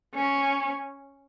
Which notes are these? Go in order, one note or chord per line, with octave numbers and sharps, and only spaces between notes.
C#4